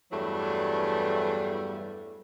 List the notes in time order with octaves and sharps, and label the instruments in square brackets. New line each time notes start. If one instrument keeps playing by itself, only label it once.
[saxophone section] E2 G2 E3 F#3 G3 A3